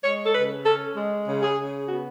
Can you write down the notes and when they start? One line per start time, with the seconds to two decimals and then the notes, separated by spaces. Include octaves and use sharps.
0.04 G#3 C#5
0.25 A4
0.35 C#3 B4
0.65 C#4 A4
0.96 G#3
1.27 C#3
1.43 G#4
1.58 C#3
1.88 B3 F#4